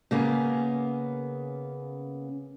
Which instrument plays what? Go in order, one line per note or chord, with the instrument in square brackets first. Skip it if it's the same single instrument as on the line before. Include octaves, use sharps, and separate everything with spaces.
[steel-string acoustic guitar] C#3 A#3 B3 C#4